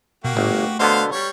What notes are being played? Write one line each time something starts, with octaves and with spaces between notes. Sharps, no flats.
B2 A#3 F#4 G4
G1 A2
A3
B2 D3 B3 C5 F5
G3 C#5